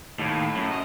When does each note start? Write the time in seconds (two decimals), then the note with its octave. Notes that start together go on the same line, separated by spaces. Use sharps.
0.19 D#2 A2
0.56 F#2
0.71 D#5